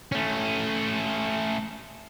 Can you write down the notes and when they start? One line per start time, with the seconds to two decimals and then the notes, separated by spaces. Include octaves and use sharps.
0.12 A3 C#4